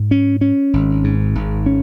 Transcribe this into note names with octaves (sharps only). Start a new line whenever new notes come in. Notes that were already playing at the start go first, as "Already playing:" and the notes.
Already playing: G#2
C#4
C#4
G#1
G#2
G#1
C#4